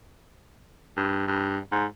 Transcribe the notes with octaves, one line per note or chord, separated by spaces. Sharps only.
G2
G2
G#2